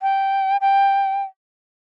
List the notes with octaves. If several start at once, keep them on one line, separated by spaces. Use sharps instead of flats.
G5
G5